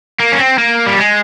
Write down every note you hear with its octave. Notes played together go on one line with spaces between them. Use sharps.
A#3
C#4
C4
A#3
G3
G#3